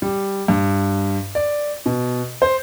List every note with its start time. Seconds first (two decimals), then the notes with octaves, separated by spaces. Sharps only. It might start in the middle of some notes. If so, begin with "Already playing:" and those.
0.02 G3
0.48 G2
1.35 D5
1.86 B2
2.42 C5